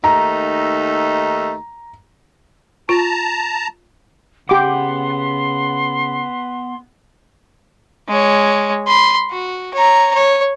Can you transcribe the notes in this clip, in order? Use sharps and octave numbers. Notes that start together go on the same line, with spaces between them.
D#2 A3 D#4 A#5
F4 A5 A#5
C#3 B3 G4 F#5 C6 D6
G#3 C#5
B5 C6
F#4
C#5 A#5
C#5